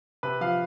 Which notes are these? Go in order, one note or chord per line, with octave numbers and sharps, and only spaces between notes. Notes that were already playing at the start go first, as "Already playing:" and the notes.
C3 B4
F3 F5